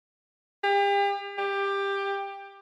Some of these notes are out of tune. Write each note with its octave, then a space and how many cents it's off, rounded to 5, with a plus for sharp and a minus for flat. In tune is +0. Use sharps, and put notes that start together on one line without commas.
G4 +40
G4 +15